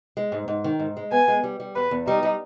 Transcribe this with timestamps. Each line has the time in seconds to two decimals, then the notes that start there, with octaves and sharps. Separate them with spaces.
0.17 G#3
0.32 G#2
0.48 G#2
0.64 D#3
0.80 G#2
0.97 G#3
1.12 B3 G#5
1.28 G#3
1.44 G3
1.60 G3
1.76 E2 B4
1.91 E2
2.07 G3 D#4
2.23 G3